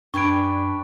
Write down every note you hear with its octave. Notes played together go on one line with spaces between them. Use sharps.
F#2 D4 G4 B4 G#5 C#6 D7